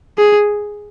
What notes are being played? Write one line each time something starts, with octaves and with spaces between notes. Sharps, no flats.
G#4